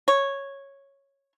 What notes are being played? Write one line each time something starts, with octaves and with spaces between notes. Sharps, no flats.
C#5